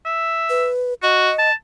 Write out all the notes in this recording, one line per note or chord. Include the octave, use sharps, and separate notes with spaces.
E5
B4
F#4 D#5
A5